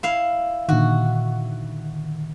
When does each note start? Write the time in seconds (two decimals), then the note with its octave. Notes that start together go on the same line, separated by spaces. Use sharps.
0.03 E4 F5
0.69 A#2 D3 D#3 F#4